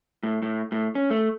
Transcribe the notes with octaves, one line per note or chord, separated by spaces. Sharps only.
A2
A2
A2
C#4
A3